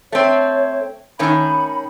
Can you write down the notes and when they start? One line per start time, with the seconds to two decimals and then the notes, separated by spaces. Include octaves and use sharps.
0.12 A3 C4 C#5
1.19 A2 D#3 C#4 B5